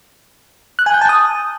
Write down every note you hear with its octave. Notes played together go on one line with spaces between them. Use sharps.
F#6
G#5
G6
A5
D#6